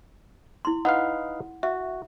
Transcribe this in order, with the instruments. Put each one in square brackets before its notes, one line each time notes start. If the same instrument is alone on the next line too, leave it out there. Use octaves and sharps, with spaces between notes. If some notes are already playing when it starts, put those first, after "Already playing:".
[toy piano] E4 C6
[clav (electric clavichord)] D#4 B4 F5 [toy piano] F#5
[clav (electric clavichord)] F#4 [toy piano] E5